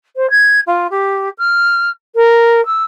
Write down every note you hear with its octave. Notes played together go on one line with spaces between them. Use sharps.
C5
G#6
F4
G4
F6
A#4
E6